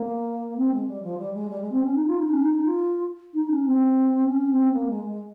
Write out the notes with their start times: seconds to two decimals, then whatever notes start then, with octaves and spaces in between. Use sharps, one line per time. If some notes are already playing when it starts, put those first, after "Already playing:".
Already playing: A#3
0.57 C4
0.72 G#3
0.88 G3
1.02 F3
1.18 G3
1.33 G#3
1.49 G3
1.60 G#3
1.72 C4
1.83 C#4
1.95 D#4
2.06 F4
2.18 D#4
2.30 C#4
2.42 D#4
2.65 F4
3.34 D#4
3.50 C#4
3.65 C4
4.27 C#4
4.50 C4
4.72 A#3
4.88 G#3
5.04 G#3